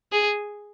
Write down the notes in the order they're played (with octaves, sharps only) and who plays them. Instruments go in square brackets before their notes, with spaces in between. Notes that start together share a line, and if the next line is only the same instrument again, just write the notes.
[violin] G#4